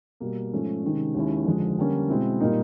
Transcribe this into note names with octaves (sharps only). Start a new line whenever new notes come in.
B2 G3 A#3
G#2 F3 A3 C#4
C3 D#3 G#3 C#4
D#2 D#3 G#3 C#4 E4
F2 D3 F3 G#3
D3 G3 A#3 C#4
B2 G#3 C4 E4
A#2 G3 A#3 D#4